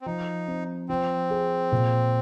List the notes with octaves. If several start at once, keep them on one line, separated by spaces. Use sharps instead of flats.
C4
F3 D#4
C4
F3 C4
G#4
A#2